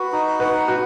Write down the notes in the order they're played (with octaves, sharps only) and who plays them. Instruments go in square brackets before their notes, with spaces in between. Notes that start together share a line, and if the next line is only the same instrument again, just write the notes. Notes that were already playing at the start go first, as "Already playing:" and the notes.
Already playing: [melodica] F#4 [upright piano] B4
[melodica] D#4
[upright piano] B4 [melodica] F#5
[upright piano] F#4 [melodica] B4